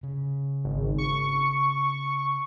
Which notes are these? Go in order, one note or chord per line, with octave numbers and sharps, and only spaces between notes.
C#3
G#1
C#6